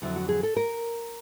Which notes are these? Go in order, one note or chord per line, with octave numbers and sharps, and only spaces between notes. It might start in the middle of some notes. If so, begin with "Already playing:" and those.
F2 D3 F#3 E4
F#4
G#4
A4
A#4